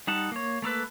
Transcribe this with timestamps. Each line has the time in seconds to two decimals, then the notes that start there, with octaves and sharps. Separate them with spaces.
0.07 G3 D#4 F#5 A5
0.32 A#3 C#5
0.62 A3 A#3 A4 B4